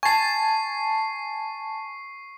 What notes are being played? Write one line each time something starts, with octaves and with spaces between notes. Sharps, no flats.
G#5 A5 C#6 C7